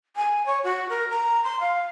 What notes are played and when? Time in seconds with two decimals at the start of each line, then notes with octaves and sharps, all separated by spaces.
0.16 G#5
0.46 C#5
0.64 F#4
0.89 A#4
1.10 A#5
1.44 C6
1.60 F5